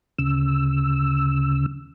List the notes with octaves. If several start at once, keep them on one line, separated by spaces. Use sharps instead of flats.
D2 C#3 E6